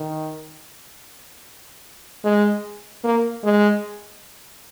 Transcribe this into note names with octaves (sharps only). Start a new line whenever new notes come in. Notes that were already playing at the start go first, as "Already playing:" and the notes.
Already playing: D#3
G#3
A#3
G#3